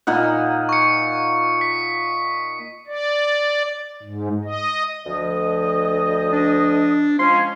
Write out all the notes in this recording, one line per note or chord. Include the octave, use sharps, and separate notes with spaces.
A#2 D#4 F#5
C#6 C#7
B6
D5
G#2
D#5
D2 F3 D#5
D4
F3 G#3 C#4 C6